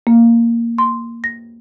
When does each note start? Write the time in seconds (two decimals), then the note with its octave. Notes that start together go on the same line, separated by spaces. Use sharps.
0.07 A#3
0.78 C6
1.24 A#6